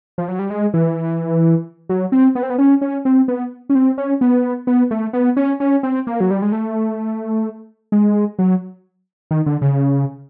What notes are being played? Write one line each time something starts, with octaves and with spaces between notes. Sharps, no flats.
F3
F#3
G3
G#3
E3
F#3
C4
B3
C4
B3
C#4
C#4
C4
B3
C#4
C4
C#4
B3
B3
A3
B3
C#4
C#4
C4
A#3
F#3
G3
G#3
A3
G#3
F#3
D#3
D3
C#3